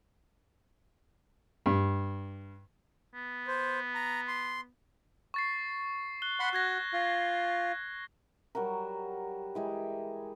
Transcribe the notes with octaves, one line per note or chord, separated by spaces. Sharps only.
G2
B3
C5
A#5
C6
C#6 A6 C7
F#6 G7
F#5 B5 C6
F#4 F#6 G#6 A#6
F4
F#3 G3 F#4 A#4
E3 G#3 G4